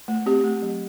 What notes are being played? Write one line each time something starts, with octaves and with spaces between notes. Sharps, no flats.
A3
C4 G4
A3
F#3